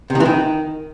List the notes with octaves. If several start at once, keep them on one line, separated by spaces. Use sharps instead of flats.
C3
D#3
E3
D#3